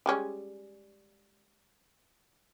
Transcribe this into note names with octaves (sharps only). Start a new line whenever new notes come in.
G3 G#3 C#4